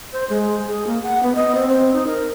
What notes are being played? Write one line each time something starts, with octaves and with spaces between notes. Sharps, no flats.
C5
G#3
G#4
A#3
F#5
B3
D#5
C4
C4
D#4
A#4